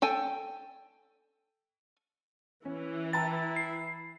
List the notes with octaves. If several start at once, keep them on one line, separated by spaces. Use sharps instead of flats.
A4 G5 G#5
E3 C#4
E4 G5 A5 A#5 A6
C7